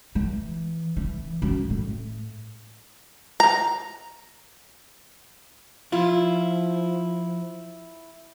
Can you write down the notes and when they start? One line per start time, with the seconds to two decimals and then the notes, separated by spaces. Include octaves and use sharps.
0.15 E3
0.97 E3
1.42 F#2
1.70 A2
3.40 A#5
5.92 F3 E4 F4